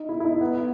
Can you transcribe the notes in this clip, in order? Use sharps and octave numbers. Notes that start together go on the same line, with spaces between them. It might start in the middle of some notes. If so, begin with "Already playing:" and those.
Already playing: D#4
E4
E4
D#4
B3
B3